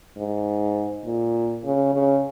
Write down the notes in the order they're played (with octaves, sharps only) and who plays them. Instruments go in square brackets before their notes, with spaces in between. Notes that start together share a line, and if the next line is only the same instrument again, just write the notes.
[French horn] G#2
A#2
C#3
C#3